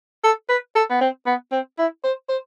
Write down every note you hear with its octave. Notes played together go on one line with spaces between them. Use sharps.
A4
B4
A4
B3
C4
B3
C4
E4
C5
C5